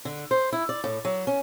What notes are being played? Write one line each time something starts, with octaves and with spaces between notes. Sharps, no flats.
D3
C5
E4
D5
A2
F#3
C#4